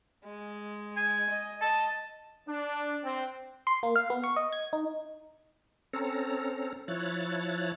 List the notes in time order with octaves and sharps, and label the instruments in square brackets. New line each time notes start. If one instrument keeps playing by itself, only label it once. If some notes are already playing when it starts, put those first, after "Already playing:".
[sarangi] G#3
[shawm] G#5
[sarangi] D#5
[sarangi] D#5 [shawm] A5
[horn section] D4
C4
[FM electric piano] C6
A#3
F5
B3
C#6
D#5
G#6
D#4
[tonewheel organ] C4 C#4 A4 A#5
F3 E4 C#5 F#6 A6